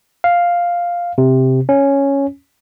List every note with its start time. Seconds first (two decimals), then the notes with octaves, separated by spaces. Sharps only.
0.24 F5
1.18 C3
1.69 C#4